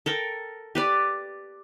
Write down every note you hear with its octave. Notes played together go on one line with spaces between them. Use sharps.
A4 A#4 G5
G4 B4 D5